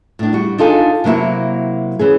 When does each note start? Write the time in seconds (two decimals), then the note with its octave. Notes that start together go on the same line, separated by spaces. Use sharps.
0.19 A2 D4
0.33 G3 F#4
0.58 D4 D#4 F4 A4 G#5
1.04 C3 F#3 A#3 E4 F#4
1.99 E3 C#4 G#4